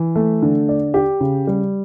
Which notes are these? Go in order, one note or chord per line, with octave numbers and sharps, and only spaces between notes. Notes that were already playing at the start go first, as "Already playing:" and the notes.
Already playing: E3
A3
D3
D5
G4
C#3
G3